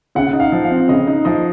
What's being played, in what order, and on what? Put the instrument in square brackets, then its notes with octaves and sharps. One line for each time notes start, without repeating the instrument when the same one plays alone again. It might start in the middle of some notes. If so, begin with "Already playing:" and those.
[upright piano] C#3 [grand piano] F#5
[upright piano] D#4
[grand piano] F5
[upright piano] F3
[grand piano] F5
[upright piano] C4
[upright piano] C#3 [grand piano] D#5
[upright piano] D#4
[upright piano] F3 [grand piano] D#5